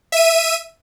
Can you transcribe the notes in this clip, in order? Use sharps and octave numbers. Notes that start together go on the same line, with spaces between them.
E5 D#7